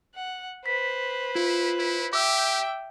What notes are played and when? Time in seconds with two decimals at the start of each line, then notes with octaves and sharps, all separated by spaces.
0.15 F#5
0.66 B4 C5 B6
1.35 E4 F4
1.78 E4
2.13 G4 E5 G5 D6 E6